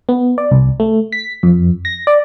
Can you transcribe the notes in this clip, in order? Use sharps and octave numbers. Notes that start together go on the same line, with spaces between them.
B3
D5
C2
A3
B6
F2
A#6
D5